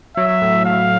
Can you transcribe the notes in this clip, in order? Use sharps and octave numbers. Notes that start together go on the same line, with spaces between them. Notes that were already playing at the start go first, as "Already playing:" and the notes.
F#3 E5
A2
A2 F5